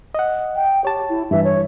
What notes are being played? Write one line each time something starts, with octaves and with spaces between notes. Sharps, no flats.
D#5 F#5
G5
G4 C#5 A5
E4
G2 E3 E5
C#5